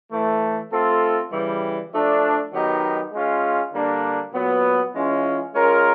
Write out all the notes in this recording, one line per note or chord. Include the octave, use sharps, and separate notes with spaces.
A2 E3 A3
A3 C4 F4 A4
C#3 E3 G3
F3 A3 D4
D#3 F#3 B3 D#4 G4
G#3 C#4 F4
D3 G3 A#3 D4
A#2 F#3 B3
E3 G#3 C#4 F4
G#3 C#4 F4 A#4